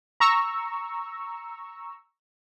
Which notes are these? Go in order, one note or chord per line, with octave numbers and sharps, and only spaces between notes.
A#5 C#6 E6